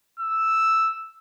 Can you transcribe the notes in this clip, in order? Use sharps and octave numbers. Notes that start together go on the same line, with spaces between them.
E6